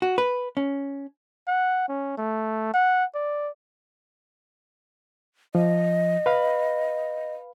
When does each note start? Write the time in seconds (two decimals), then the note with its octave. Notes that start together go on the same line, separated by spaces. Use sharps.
0.02 F#4
0.18 B4
0.57 C#4
1.47 F#5
1.89 C#4
2.18 A3
2.74 F#5
3.15 D5
5.55 F3 D#5
6.26 B4 F5 B5